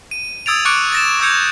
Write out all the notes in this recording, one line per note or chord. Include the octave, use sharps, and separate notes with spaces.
D#7
D#6 E6 G#6 A6 D7 F7
C#6 D6 F#6 C#7 D7
A6 A#6 E7
D6 E6 G6 G#6 C#7 F7